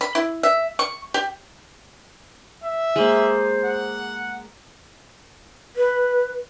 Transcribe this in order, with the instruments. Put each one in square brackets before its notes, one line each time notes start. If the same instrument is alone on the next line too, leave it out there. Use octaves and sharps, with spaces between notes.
[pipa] B5
E4
E5
C#6
G4
[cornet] E5
[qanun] G#3 A#3 [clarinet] C5
[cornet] F#5
[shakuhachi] B4